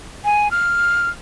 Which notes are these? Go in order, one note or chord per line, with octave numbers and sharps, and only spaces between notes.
G#5
F6